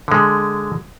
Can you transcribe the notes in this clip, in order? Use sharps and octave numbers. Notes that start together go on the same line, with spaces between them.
D3 G#3